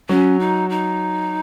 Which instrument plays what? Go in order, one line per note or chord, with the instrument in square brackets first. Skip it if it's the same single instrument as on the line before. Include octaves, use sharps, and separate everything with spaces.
[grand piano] F#3 [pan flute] C#4
[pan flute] D#4
D#4